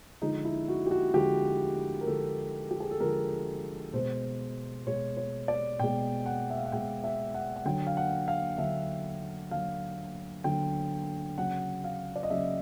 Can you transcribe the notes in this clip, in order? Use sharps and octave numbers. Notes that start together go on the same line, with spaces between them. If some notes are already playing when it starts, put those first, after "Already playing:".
D3 F3 G#3 D#4
E4
F#4
G4
F#4
D3 F3 G#3 G4
A#4
D3 F3 G#3 A4
G4
G#4
A4
D3 F3 G#3 A#4
B2 G#3 C5
B2 G#3 C#5
C#5
D5
B2 G#3 G5
F#5
E5
F5
F#5
B2 G#3 G5
E5
F#5
F#5
D3 F#3 G5
F5
F#5
F5
D3 F#3 E5
D3 F#3 F5
D3 F#3 G5
C#3 F#3 F#5
F5
D5
D#5
C#3 F#3 E5